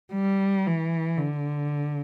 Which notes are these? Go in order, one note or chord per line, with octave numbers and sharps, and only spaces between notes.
G3
E3
D3